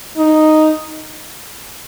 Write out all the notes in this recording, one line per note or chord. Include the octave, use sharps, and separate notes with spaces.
D#4